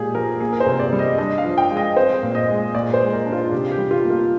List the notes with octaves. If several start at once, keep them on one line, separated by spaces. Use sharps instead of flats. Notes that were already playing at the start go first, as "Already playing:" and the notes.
Already playing: A#2 G#3 G4 G#4
F3 A#4
A#3 G#4
A#4
C5
C3
D5
G3
D#5
D4 D#5
F5
F3
G5
G#3
D#5
C4 C5
A#2
D#5
G#3
A#2 D5
C5
G#3
A#4
D4
F4
C3 G4
G4
G3
F4
A#3
F4